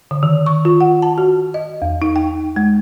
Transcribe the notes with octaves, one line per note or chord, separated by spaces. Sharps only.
D3
D#3
C#6
F4
F#5
A5
F#4
D#5
E2
D#4
G5
G#3